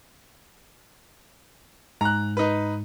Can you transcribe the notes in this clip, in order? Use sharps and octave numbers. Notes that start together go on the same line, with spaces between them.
G#2 A#5 F#6
D#4 B4